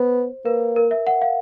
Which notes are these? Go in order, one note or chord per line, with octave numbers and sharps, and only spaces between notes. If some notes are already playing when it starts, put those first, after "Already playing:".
Already playing: B3 C5
A#3 B4
A#4
E5
F#5
F5